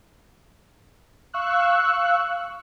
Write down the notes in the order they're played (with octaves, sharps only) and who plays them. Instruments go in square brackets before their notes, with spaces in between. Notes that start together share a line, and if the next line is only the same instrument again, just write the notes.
[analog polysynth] F5 C#6 E6 F#6